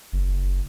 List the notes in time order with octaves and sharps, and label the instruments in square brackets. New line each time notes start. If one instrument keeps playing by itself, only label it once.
[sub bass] F#1